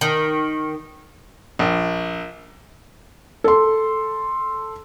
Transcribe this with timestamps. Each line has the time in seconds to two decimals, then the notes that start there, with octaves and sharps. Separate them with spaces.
0.01 D#3
1.59 A#1
3.44 A4 C6